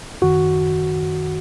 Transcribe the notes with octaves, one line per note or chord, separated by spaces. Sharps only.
F#2 D#3 F#4